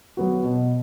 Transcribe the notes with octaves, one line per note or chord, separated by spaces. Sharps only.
F#3 B3 F#4
B2